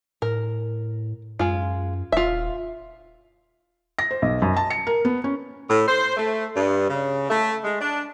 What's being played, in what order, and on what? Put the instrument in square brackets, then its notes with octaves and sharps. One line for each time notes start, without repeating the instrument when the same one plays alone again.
[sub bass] A2 [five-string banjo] A#4
[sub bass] F#2 [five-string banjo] G#3 F4
[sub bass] D#1 [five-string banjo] F4 E5
[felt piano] A#6
C5
B1
F#2
A5
C#7
A#4
B3
C#4
[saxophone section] A2
C5
A3
G2
C#3
A3
G#3
D4